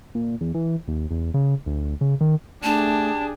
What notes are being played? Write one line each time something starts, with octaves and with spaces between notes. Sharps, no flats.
A#2
E2
E3
D#2
E2
C#3
D2
C#3
D#3
A3 D4 G4 G#4 A5